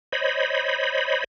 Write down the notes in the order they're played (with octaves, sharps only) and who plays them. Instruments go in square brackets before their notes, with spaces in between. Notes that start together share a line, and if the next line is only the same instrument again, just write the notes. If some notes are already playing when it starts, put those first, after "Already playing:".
[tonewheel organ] C5 C#5 D#5 B5